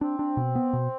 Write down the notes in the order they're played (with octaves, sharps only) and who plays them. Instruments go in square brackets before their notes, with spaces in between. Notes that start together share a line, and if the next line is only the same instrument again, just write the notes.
[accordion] C4 [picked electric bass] D4
[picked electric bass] D4
B2
B3
B2